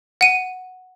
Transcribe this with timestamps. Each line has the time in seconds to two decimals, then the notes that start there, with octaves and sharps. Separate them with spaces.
0.21 F#5 D#7